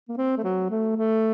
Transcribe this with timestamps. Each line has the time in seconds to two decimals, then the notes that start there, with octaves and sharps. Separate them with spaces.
0.09 A#3
0.17 C4
0.37 A3
0.44 F#3
0.70 A3
0.96 A3